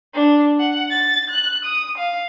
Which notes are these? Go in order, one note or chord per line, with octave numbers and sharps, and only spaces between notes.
D4
F#5
A6
F#6
D#6
F5